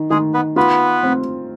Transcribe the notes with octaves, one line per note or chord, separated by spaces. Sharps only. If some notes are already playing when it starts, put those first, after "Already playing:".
Already playing: D#3
D#3 G#3 G#4
B3 B4
B3 F4 B4
C4